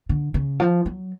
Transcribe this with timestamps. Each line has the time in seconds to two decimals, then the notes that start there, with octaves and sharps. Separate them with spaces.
0.09 D3
0.34 C#3
0.60 F3
0.86 F#3